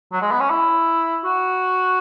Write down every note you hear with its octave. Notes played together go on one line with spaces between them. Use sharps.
F#3
G#3
B3
C#4
E4
F#4